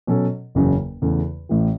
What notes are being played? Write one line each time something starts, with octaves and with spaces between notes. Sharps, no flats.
B2 F#3 C#4 A4
F#1 E2 C#3 F#3 C#4
E2 C#3 A3
A1 A2 E3